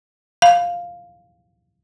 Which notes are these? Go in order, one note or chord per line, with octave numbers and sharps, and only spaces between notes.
F5